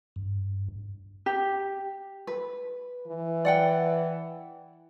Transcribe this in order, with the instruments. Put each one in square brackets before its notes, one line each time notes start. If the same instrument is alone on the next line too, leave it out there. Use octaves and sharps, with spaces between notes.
[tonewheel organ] G2
[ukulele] G4
B4
[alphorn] E3
[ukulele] D5 F#5 G5